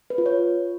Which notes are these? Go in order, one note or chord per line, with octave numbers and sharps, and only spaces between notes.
B4
F4
C#5